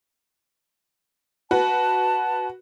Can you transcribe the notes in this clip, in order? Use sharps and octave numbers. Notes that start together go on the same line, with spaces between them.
F#4 B4 A5